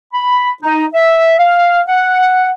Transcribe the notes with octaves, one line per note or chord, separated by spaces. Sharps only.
B5
D#4
E5
F5
F#5